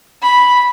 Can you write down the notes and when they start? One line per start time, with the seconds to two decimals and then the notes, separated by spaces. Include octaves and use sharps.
0.22 B5